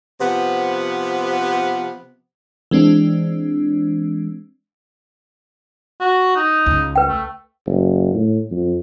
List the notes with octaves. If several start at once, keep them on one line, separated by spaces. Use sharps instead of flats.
C3 F3 B3
E3 G#3 C4 D4
F#4
D#4
C#2
B4 G5
A3
F#1
A2
F2